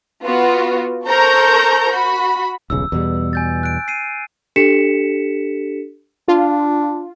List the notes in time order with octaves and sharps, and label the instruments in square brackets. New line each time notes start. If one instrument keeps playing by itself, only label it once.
[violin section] B3 F4 F#4
A4 A#4 C5 A#5 C#6 G6
F#4 B5
[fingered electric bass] D#1 B1 C#3 [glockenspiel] E6
[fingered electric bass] E2 B2 G3
[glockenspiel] G#5 G6 A6
F#6 D7
C7 D#7
[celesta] D4 G4 A4 B6 C#7 E7
[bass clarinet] D4 [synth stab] F4